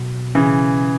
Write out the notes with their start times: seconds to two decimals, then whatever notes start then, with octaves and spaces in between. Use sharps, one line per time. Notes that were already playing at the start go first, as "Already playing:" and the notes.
Already playing: B2 F#3 F#4
0.35 C#3 E3